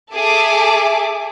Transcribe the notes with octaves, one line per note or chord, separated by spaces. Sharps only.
G#4 A4 E5 D6